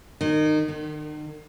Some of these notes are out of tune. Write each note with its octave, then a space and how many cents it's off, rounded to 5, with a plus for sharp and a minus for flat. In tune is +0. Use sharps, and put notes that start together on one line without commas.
D#3 -25
D#3 -45